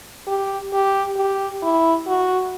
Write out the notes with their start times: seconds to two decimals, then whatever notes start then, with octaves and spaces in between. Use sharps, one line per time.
0.27 G4
0.73 G4
1.17 G4
1.63 E4
2.07 F#4